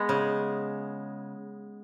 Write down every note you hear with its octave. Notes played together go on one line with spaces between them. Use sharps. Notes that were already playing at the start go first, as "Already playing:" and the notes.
Already playing: G#3 B3
C#3